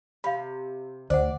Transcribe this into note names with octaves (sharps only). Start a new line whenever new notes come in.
C3 F5 B5
D2 C5 D5 F#5